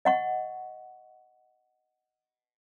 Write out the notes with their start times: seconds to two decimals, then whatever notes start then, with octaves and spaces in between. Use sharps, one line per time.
0.05 D#5 F#5 C#6